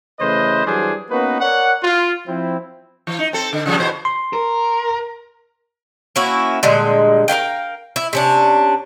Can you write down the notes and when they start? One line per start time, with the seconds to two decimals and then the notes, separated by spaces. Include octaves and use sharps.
0.20 C#3 E3 A3 B4 C5 D#5
0.66 E3 F#3 G3 D4 G#4 C5
1.10 A#3 B3 C#4 D#4 F#4 B4
1.41 A#4 C#5 D5 F#5
1.83 F4
2.27 F3 C4 E4
3.07 E3
3.19 D#4
3.33 C4 A4
3.53 D3
3.66 C#3 F3 G3
3.78 E2 B2 C5
4.05 C6
4.33 A#4
6.16 A#3 C#4 E4 F#4
6.63 A#2 D3 G3 G#3
7.28 A#4 B4 F5 G5
7.96 E4
8.13 C3 C#4 D4